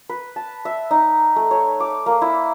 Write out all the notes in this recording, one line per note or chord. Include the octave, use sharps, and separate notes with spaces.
B4
A5
E5
D#4
A3
C#5
D6
A#3
E4